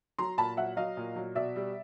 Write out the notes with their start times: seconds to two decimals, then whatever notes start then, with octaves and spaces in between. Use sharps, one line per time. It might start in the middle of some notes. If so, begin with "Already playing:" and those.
0.18 F#3 A#5 C6
0.38 A#2 A5 B5
0.57 F#3 E5 F#5
0.77 F#3 D#5 F5
0.97 A#2
1.16 F#3
1.35 B2 D5 E5
1.56 G3